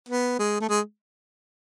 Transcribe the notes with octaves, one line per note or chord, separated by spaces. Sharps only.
B3
G#3
A3
G#3